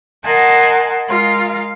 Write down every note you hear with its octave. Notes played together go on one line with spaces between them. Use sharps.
A#4 D#5 F#5 G#5 A5 C6
G#3 F4 A#4 F5